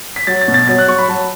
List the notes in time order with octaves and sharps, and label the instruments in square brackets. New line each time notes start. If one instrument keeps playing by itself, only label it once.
[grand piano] B6
F#3 A6
A6
B2
A6
F#3 A6
F#6
F#3 C#6
B5
F#3 A5